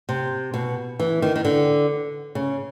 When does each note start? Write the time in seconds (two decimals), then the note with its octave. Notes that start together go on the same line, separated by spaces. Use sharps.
0.09 C3
0.54 B2
0.99 E3
1.22 D#3
1.36 D#3
1.45 D3
2.35 C#3